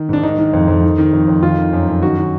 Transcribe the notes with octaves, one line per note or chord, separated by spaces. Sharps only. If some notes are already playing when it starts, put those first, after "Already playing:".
Already playing: D#3
G#2 D4
D#3 D#4
D#3
F2
F2
D#3
D#3
F2
F2
D#3 F4
D#3
F#2
F#2
D#3 F#4
D#3